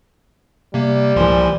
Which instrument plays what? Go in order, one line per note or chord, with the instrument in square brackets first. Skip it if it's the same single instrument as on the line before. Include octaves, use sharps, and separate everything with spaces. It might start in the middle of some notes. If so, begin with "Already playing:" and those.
[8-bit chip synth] C3 A#3 [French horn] G3
[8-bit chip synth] C2 F3 C6 [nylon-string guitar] A#2 E3